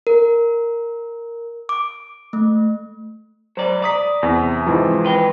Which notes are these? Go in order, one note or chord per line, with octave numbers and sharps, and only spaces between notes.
A#4
D6
A3
F#3 C5 D5
D5 A#5 D#6 B6
E2 C3
G#2 E3 F3
B4 G5